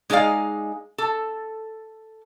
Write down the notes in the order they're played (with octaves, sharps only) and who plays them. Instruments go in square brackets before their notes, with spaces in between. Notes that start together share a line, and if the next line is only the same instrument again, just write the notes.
[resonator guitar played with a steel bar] G#3 D#4 G#4 D5 F5
A4